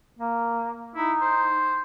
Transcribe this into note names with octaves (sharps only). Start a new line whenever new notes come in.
A#3
D#4 E4
C5